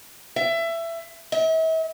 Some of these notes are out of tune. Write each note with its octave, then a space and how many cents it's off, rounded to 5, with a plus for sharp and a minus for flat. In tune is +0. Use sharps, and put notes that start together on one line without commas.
E5 +20
E5 -40